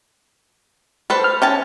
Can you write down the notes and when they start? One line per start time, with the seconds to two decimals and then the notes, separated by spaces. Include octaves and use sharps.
1.10 A4 B4 C5
1.24 F6
1.42 C#4 G5 A5